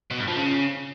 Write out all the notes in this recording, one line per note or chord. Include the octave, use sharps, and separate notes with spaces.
B2
G2
F3
C#3